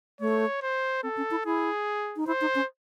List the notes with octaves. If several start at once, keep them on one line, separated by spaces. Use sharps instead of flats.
A3 C#5
C5
C4 A4
C#4
E4
E4 G#4
D#4
E4 C5
D#4
C#4